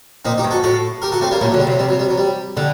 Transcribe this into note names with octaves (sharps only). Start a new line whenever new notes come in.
A#2 C4 D#4
D#4 G4
G2
F#4 A4
A2 F#4 A4
G4 A#4
F#4 A4
A3 C4
G3 A#3
A#2 F#3 A3
F#3
D3
G3
C3
F#3
C3 G3
F#3
G3
F#3
G3
D3 G3